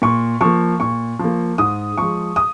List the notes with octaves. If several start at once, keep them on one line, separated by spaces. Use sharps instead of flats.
A#2 C#6
F3 A#3 C#6
A#2 C#6
F3
A#3
G#2 D#6
F3 G#3 C#6
D#6